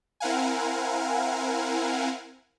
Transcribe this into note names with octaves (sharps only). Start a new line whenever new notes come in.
C4 E4 A#4 F5 F#5 G#5